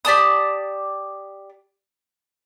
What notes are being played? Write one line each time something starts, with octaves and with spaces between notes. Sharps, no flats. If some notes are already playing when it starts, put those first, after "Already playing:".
G4 D5 A5 D#6